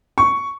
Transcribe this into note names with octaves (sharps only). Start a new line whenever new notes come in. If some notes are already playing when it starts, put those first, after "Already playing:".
C#6